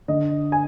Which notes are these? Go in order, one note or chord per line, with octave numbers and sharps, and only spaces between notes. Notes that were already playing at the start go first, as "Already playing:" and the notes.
D3 D#5
G#5